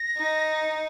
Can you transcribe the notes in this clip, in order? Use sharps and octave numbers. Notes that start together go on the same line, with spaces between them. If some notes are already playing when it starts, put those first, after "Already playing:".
Already playing: A#6
D#4